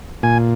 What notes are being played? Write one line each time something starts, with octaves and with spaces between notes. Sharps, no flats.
A#2 G#5